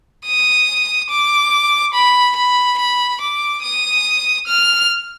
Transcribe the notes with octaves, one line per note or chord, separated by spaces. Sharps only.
D#6
D6
B5
B5
B5
D6
D#6
F6